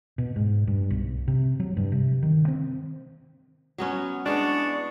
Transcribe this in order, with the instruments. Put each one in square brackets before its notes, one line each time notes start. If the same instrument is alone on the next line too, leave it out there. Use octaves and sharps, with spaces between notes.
[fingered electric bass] B2
G#2
G2
B1
C3
F#3
G2
C3
D#3
C4
[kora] F#3 B3 C#4
[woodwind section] E2 C#6 [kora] G#3 B3 [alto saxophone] D4